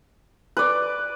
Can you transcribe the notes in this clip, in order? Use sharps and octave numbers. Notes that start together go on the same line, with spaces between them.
B4 D5